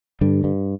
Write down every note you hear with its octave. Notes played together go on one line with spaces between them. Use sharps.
G2 D3 G3
G2